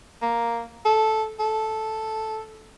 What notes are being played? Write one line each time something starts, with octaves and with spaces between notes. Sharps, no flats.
A#3
A4
A4